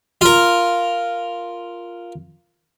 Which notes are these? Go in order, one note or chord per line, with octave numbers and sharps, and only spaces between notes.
F4 A#4